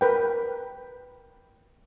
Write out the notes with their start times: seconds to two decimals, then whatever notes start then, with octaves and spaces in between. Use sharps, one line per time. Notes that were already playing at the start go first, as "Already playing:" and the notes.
0.01 A#4 B4 G5